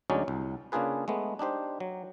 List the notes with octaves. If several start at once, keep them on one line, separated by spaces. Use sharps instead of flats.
D2 F#3 G#3 C#4 D#4 D5
C2
C#3 A#3 D4 F4 G#4 B4
G#3 A3 B3
D4 D#4 G4 C5
F#3